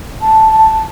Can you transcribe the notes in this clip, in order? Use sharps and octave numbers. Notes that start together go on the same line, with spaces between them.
A5
A5